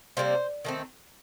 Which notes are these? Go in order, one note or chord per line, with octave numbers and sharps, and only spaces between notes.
C3 D#3 G3 A#3 C5
D#3 A3 C4